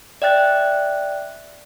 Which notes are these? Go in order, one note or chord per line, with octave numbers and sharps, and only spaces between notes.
D5 E5 G5 F#6 A6